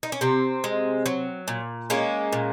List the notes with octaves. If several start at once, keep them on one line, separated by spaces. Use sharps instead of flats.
D#4
C#4
C3 C4
G#3
F#3
A#2
G#3 A#3 C#4
A#2